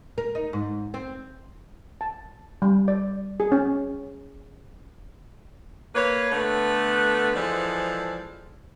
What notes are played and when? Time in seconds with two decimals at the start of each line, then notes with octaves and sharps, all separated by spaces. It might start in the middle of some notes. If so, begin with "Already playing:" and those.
0.18 A#4
0.35 D#4
0.53 G#2
0.94 C4
2.01 A5
2.62 G3
2.88 D5
3.40 G#4
3.52 C#4
5.95 A#3 B4 C#5
6.32 D3 A3 B3 D4 B4
7.35 E3 F3 G#3 A4 C5 D5